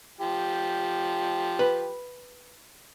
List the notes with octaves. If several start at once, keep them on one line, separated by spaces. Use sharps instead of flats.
F3 G4
B4